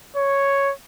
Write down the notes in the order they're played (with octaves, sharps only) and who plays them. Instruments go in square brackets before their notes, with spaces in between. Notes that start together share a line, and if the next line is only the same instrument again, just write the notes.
[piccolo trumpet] C#5